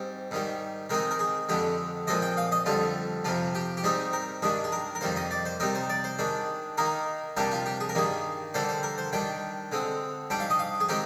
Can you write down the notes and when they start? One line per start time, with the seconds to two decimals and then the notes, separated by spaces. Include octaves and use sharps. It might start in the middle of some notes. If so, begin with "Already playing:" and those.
Already playing: G#2 G3 C4
0.31 G#2 D#3 G3
0.90 D#3 G#3 C4 D#4 A#4
1.11 A#4
1.19 G#4
1.49 F2 D3 G#3 G4
2.07 A#2 F3 G#3 C4 D#5
2.22 G5
2.37 F5
2.52 D#5
2.66 F2 D3 G3 F4
3.25 F2 C3 F3 F4
3.55 G4
3.77 G4
3.83 G#2 G3 C4 D#4 G#4
4.13 A#4
4.42 G2 D#3 G#3 D4 G#4
4.64 G#4
4.72 A#4
4.95 A#4
5.01 F2 D#3 G3 A#3 C5
5.16 D#5
5.31 D5
5.46 C5
5.60 C3 G3 C4 D#4 A#4
5.75 C5
5.89 D5
6.04 C5
6.19 D#3 G#3 D4
6.78 D#3 A#3 D#4 A#4
7.37 C3 G3 A#3 D4 G4
7.51 F4
7.66 G4
7.80 G#4
7.89 A#4
7.95 G2 D#3 A#3 G#4
8.54 D3 G3 A#3 D4 C5
8.69 C5
8.83 A#4
8.98 C5
9.13 D#3 G3 D4 G5
9.72 D3 G#3 C4
10.30 G#2 G3 D4 G5
10.40 F5
10.50 D#5
10.59 F5
10.80 G#4
10.89 D#3 G#3 C4 D#4 G4